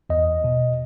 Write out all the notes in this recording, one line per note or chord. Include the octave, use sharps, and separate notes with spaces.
E2 D#5
B2